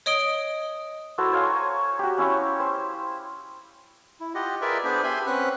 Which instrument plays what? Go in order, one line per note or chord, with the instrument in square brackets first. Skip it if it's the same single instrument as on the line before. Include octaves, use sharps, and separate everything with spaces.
[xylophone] C#5 D#5 D#6 D7 G7
[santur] E4 F#4 A4 C5
C5 C#5 F5 G#5
A#5
F#4 G4
C#4 E4 F5 C#6
C5
[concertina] E4
F4 G4 D#5 F#5
F4 G#4 A#4 B4 D5 E5
B3 D4 G#4 B4 C5
G4 E5 G#5 B5 C6
C4 C#4 B4 F#5 F#6